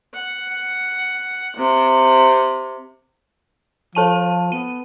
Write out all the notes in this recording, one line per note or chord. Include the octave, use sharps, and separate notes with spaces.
F#5
C3
F3 A4 A5 D#7
B3 D#7